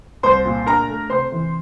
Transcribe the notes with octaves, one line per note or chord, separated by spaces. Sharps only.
C2 C5 C6
A#2
D4 A#4 A#5
A3
C3 C5 C6
E3